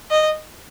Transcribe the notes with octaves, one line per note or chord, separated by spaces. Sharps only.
D#5